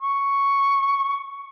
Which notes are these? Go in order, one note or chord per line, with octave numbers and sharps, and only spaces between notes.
C#6